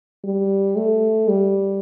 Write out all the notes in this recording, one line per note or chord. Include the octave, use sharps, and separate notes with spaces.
G3
A3
G3